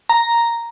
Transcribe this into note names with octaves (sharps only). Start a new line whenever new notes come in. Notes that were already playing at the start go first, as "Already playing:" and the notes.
A#5